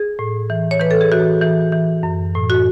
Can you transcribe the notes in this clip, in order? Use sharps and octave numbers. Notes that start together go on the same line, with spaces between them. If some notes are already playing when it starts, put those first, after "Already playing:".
Already playing: G#4
A2
E3
C#5
E3 B4
A4
G#4
E3 F#4
E3
E3
F#2
A2
F#4